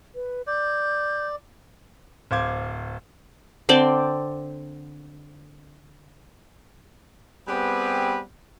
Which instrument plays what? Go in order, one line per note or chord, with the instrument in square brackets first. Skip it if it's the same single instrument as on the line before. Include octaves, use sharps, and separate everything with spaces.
[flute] B4
[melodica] D5 [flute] G6
[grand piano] D1 C5 F5 D6 G#6
[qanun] D3 C4 D5 G5
[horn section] G3 B3 C4 G4 G#4 B4